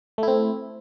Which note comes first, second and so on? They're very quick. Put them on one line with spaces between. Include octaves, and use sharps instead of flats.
A3 E4 C4